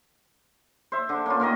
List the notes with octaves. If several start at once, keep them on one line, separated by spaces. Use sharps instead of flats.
C5 E5
D3 D4
A#3 C#4 F4
A#2 D#3 A#4 D#5